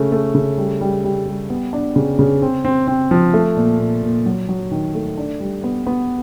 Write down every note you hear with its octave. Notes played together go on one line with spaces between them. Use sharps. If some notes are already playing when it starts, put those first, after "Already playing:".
Already playing: C#3 A3
A3
C#3
G3
G3
G3
G3
B3
D4
C#3
C#3
C4
C4
C4
F3
A3
A#2
A#2
A#2
F#3
F#3
D#3
A3
D4
G3
B3
B3